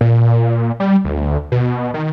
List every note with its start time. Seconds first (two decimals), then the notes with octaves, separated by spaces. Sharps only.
0.01 A#2
0.80 G3
1.05 D2
1.52 B2
1.94 D#3